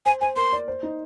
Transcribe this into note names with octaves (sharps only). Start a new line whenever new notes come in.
C5 G#5
C5 G#5
A#4 C6
D5
C5
D#4